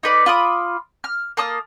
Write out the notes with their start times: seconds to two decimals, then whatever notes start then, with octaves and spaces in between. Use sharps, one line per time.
0.03 D#4 B4 D5
0.26 F4 B5 D6 D#6
1.04 F6
1.37 A#3 A5 D#6 F6